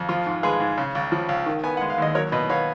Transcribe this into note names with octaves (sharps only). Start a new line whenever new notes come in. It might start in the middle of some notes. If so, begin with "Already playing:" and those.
Already playing: F2
F3 F4
G#2
G#3 G#4 B4
G#2
C#3
C#2
F3
C#2
D#3
B3 G#5
G#3 F#5
F5
D#2 D#5
F#3 A#4 C#5
B2 B4 D#5
B3 C#5 F5